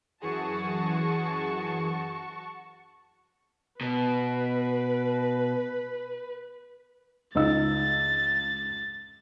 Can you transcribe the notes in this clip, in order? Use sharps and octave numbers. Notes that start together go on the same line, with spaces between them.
F#2 E3 F#4 G#4 A5 C#6
B2 B4
C#2 D#4 E6 A6